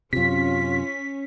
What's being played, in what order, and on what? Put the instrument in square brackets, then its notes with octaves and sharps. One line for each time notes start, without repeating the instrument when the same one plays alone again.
[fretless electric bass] F#2 C3 [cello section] C#4 [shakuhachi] F4 [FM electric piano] B6